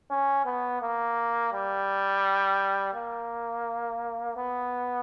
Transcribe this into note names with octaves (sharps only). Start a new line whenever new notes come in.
C#4
B3
A#3
G3
A#3
B3